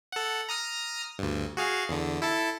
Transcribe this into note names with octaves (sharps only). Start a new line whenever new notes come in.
A4 F#5
A#5 D#6 F6
D2 G2
F#4 G#4 F5
E2 D3
E4 A4 A5